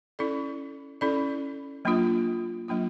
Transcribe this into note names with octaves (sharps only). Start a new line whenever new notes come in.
C#4 E4 A4 D5
C#4 E4 A4 D5
F#3 A#3 D4 F4
F#3 A#3 D4 F4